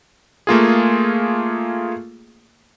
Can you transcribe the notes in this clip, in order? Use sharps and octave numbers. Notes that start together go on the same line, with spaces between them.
A3 A#3 F4 G#4